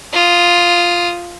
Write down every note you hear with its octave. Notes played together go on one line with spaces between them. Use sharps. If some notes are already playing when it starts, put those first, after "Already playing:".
F4 D#6